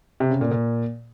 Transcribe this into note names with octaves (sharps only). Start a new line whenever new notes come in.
C3
C#3
A#2
A#2